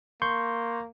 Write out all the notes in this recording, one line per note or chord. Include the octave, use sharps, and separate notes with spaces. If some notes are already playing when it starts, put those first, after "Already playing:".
A#3 C6 C#6 G6